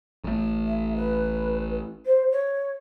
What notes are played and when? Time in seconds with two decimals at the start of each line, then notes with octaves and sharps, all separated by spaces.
0.24 A1 A3
0.67 E5
0.96 B4
2.06 C5
2.32 C#5